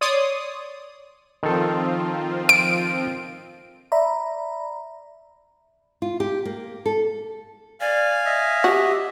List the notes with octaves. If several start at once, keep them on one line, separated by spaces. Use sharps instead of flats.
C#5 D5 C6 D#6
D#3 F3 C4 F4 A4
D7
D5 E5 A#5 B5
F4
G4
A#3
A4
D5 F5 G#5
D#5 E5
F#4 G4